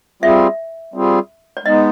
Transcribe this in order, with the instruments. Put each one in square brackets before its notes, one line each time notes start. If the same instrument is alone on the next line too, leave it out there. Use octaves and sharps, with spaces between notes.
[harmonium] G3 C4 F4 G#4 [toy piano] E5
[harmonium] G3 C4 F4 G#4
[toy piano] D5
[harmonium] G#3 B3 D#4 [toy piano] D#5